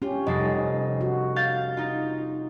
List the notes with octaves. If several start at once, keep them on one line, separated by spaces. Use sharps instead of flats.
C#4 F4 G4
F1 G3 A4 D#5 C7
F#4
F5 G6 A6
D#4 F4